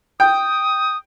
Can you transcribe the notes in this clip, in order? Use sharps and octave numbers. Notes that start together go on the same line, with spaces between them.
G5 D#6